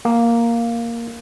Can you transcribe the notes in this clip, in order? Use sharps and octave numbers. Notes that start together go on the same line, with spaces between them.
A#3